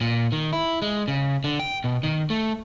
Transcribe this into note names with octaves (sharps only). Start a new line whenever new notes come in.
A#2
D#3
E4
G#3
C#3
D3
G5
B2
D#3
A3